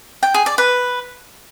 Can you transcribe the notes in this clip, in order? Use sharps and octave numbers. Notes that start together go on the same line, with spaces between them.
G5
G#4
D5
B4